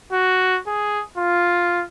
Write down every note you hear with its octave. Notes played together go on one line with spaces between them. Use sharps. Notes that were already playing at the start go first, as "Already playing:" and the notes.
F#4
G#4
F4